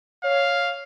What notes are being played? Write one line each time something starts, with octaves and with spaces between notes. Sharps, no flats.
C#5 F5